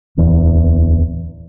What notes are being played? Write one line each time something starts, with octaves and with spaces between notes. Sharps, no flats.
D1 E2